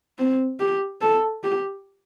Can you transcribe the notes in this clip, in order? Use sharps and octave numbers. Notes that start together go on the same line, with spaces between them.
C4
G4
A4
G4